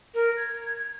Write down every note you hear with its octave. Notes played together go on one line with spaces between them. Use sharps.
A#4
G#6